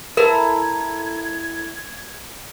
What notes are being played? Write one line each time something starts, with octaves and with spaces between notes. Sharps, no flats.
E4 A4 A#4 A#5 G#6